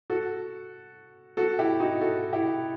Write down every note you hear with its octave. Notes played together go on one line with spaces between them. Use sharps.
F#4 A4
F#4 A4
E4 G4
D#4 F#4
F#4 A4
E4 G4